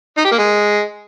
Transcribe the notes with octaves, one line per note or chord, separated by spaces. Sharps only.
D#4
G4
A#3
G#3